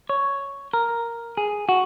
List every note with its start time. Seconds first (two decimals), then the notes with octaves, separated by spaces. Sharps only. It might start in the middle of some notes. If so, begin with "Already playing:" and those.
0.09 C#5
0.73 A#4
1.37 G#4
1.69 F#4